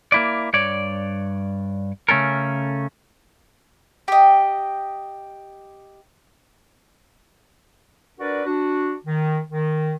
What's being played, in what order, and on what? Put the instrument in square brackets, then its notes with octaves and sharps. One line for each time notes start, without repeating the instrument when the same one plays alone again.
[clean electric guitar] A#3 E4 D5
G2 C#5 D5
C#3 A3 C#4 A4 A#4
[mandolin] G4 D#5
[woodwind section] D4 F#4 A#4 B4 D5
D4 F#4
D#3
D#3